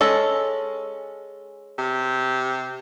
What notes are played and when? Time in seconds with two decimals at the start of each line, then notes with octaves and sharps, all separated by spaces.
0.01 G#3 C#4 A4
1.78 C3